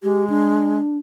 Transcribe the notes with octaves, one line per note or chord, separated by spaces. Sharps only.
G#3 G4
D4